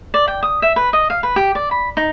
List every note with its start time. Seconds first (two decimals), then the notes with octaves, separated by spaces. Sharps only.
0.14 D5
0.28 G5
0.43 D#6
0.62 E5
0.76 B4
0.93 D#5
1.10 F5
1.23 B4
1.36 G4
1.55 D5
1.71 B5
1.97 D#4